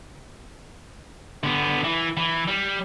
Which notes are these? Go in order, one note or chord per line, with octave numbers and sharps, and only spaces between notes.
D3 B3
E3
E3
G3